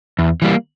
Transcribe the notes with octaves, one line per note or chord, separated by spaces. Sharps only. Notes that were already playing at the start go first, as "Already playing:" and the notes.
E2
E3 G3 A#3